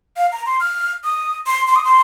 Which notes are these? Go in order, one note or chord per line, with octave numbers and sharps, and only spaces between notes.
F5
A#5
C6
F6
D#6
C6
C6
D#6
C6